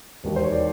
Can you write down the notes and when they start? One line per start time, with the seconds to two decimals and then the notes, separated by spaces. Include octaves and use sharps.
0.24 E1 D#2 D#3
0.36 C5
0.44 C#5
0.52 D5